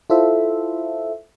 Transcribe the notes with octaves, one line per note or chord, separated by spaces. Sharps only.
E4 F4 A4 C5 E5